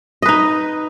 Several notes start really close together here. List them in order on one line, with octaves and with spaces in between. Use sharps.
D#5 B4 D#4